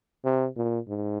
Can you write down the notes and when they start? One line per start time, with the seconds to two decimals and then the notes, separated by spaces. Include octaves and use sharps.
0.25 C3
0.57 A#2
0.88 G#2